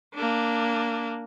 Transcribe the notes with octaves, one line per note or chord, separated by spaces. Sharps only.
A#3 D4